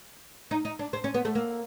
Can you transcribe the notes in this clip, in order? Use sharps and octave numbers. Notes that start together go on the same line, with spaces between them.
D#4
D#4
D4
C4
C#4
B3
A3
A#3